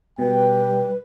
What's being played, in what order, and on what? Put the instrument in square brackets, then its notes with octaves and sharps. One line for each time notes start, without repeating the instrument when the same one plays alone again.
[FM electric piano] B2 [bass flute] G3 [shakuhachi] B4 [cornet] G5